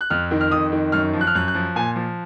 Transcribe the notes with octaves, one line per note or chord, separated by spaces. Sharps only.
F#6
F2 F6
D#3
F6
F2 D#6
D#3
F#2 F6
F3
F#6
F6
F#2 F#6
F#6
F3
A#2 G#5
F3